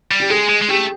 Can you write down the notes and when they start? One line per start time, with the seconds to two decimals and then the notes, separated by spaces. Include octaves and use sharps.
0.11 G3
0.20 G4
0.30 G#3 G#4
0.49 G#3
0.61 G#3
0.69 A3 G4